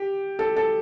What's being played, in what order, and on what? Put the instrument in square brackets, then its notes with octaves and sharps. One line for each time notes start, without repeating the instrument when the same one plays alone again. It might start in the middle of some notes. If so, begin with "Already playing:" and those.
Already playing: [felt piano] G4
A4
A4